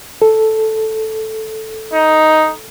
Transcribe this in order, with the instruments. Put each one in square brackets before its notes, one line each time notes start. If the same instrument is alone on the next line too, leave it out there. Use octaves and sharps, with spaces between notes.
[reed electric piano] A4
[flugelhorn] D#4